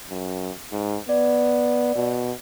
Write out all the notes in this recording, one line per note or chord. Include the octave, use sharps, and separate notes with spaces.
F#2
G#2
B3 D5
B2